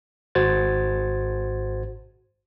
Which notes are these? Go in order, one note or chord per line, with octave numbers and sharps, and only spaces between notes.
G#1 G#2 F#4 C5 G#6 A6